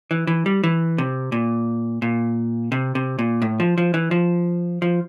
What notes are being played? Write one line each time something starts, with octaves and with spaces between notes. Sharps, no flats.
E3
E3
G3
E3
C3
A#2
A#2
C3
C3
A#2
A2
F3
F3
E3
F3
F3